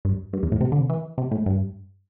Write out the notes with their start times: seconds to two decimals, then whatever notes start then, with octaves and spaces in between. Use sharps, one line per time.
0.05 G2
0.33 G2
0.43 E2
0.52 A2
0.61 C3
0.72 D3
0.80 C3
0.89 E3
1.18 C3
1.31 A2
1.46 G2